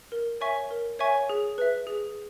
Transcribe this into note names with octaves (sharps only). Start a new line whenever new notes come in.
A#4
C#5 E5 G#5 C#6
A#4
C#5 E5 G#5 C#6
G#4
B4 E5
G#4